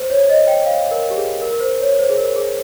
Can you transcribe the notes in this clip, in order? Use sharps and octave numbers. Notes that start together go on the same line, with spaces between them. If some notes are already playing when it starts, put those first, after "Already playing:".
Already playing: C5
C#5
D#5
G5
F5
A#4
G4
G#4
A#4
A#4
C5
C#5
C5
G#4
A#4
G#4